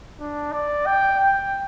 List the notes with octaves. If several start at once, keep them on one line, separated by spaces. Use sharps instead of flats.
D4
D5
G5
G5